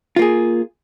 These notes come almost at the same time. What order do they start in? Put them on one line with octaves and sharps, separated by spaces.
F4 A#3 G#4